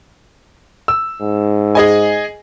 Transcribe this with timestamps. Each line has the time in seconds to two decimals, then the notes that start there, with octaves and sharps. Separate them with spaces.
0.88 E6
1.22 G#2
1.75 G#4 D#5 G#5